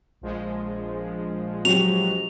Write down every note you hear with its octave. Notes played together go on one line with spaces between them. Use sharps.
A#1 F3 G#3
F#3 G4 F7